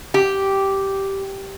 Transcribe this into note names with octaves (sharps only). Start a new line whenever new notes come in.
G4